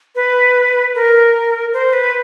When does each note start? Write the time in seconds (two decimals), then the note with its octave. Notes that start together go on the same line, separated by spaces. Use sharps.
0.15 B4
0.95 A#4
1.73 C5
1.93 B4